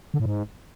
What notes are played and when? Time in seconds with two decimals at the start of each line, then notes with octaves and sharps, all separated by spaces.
0.14 D3
0.20 A2
0.26 G#2